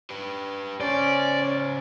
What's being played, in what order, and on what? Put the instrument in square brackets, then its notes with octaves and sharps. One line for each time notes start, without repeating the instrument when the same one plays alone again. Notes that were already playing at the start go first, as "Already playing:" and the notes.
[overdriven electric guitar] G4 B4
[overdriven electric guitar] C#3 C5 [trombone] C#4 [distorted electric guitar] D5